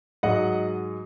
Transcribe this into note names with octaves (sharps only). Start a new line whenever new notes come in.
G#2 F#3 D#5 F#5